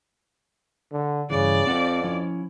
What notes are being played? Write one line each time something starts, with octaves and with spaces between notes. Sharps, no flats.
D3
G2 C#3 E3 D5
F2 C4 F#5
F3 C#4 E4